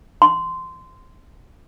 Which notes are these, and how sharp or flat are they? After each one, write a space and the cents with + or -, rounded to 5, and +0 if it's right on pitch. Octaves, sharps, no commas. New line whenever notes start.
C6 -15